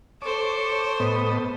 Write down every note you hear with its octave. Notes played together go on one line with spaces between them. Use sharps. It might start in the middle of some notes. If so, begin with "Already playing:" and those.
A4 C5 C#5 D6
A2 B3 D#5